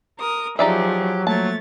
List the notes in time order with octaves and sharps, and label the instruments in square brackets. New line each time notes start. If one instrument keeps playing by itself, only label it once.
[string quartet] A#4 D#6
[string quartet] F3 G#4 [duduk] F#3 [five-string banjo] D#4 D5 E5 [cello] G4
[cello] F3 A#3 [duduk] F#3 [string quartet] A3 C#5 A6 [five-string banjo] A5